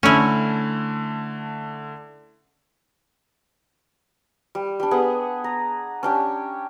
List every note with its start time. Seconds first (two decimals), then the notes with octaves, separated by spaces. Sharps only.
0.03 D3 A3 C#4 E4
4.55 G3
4.80 G3 D4
4.91 B3 G#4 B4 F#5
5.44 A#5
6.03 C#4 D4 G4